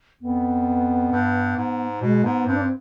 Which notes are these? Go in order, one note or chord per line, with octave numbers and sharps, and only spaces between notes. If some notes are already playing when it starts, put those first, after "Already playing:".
F2 B3
G2
G#2
B2 G#3
G#2 B3
G2 C4
D4
C4